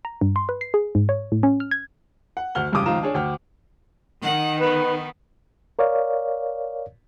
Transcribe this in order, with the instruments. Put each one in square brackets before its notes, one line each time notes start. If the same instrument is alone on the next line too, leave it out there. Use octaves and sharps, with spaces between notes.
[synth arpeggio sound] A#5
G2
C6
B4
C7
G#4
G#2
C#5
A2
C#4
F6
G#6
[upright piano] F#5
D2 F#5 F6 G7
F1 G2 C#3 G4 D6 D#6
C#2 D#3 F3 F4 A#5 E7
D4 G#4 C#5
D2 G5 F6
[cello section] D#3 [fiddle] F#5
[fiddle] B3 [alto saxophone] B4
[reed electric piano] A#4 C#5 D5 F5